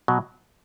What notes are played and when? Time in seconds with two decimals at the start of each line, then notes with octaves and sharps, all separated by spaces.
0.08 B2 F#3